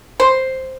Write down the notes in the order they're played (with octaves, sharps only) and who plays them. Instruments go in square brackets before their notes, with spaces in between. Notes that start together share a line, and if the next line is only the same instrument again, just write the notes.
[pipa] C5